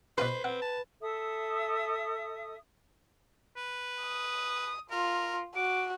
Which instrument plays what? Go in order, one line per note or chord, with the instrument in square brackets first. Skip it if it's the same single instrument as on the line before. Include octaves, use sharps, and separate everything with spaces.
[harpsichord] B2 F4 C6 [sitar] B4 [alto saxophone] C5
[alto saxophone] C4 [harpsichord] F#5
[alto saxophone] A5
[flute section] A4 E5 D#6
[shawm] B4
[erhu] D#6
[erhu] F4 [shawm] A#4
[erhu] F#4 [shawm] D6